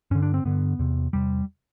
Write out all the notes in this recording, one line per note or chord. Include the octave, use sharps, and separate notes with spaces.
G2 D3 C#4
D4
C4
G2 D3 B3
E2 C3
E2 C3 G3